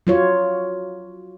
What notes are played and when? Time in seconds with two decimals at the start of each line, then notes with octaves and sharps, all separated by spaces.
0.07 F#3 F4 C#5